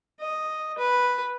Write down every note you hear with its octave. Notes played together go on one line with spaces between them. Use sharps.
D#5
B4